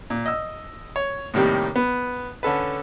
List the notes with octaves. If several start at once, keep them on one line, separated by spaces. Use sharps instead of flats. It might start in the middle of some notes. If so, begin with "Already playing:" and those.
A#2
D#5 E6
C#5
A2 C3 D#3 G3 A#3
B3
D3 C#4 A4 B4